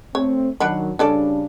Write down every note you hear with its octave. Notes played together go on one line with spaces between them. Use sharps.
A3 C4 C#5
D#3 F#3 D4 F#5 B5
C#3 G3 C#4 D4 A4 D5